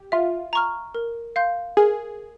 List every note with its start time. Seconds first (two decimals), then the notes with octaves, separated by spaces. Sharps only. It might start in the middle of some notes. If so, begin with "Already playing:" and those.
Already playing: G4
0.12 F4 E5
0.53 A#5 C#6 F6
0.94 A#4
1.36 F5 C6 G6
1.77 G#4 A#4